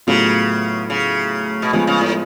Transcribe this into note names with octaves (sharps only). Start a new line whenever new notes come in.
A2 C#3 F#3 B3 F4
C#3
B2
C#3 F3 G#3 B3 F4 G#4
C#3
A2